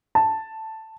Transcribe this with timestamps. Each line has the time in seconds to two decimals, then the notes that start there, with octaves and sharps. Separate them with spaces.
0.15 A5